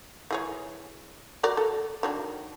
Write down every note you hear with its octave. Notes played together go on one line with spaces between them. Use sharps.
E3 G#4 C#5
F#4 A#4 D5
A4
D#3 F#3 D4